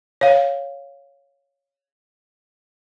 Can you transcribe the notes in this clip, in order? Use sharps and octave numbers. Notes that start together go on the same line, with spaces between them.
C#5 F5